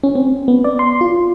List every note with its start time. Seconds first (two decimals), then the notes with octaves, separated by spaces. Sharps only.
0.03 C#4
0.15 C4
0.48 B3
0.64 D5
0.79 C6
1.01 F4